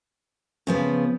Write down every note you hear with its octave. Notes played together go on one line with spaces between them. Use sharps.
C#3 F3 B3